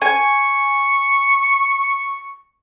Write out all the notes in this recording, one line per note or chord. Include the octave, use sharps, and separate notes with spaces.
G#5 C#6